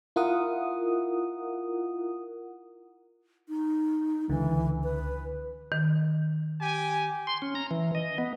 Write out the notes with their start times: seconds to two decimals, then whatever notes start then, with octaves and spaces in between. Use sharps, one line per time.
0.16 E4 F4 A#4 F#5 D#6
3.49 D#4
4.29 C#2 D3 E3
4.84 B4
5.72 D#3
6.61 G4 G#5
7.27 C6
7.42 C#4
7.55 A#5
7.71 E3
7.95 D#5
8.18 B3